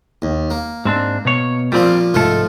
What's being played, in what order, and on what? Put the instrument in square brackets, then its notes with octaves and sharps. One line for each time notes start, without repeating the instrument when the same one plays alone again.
[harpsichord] D#2
A#3
[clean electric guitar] G#2 C4 D4
B2 C#5
[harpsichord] A#2 F3 A#3 [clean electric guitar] G3 C4
[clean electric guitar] C2 G#2 A4 [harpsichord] F3 A3 F4